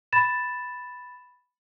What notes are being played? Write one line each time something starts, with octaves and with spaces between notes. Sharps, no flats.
B5 A6 E7